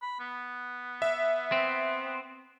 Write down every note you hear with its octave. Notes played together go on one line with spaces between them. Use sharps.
B5
B3
E5
C4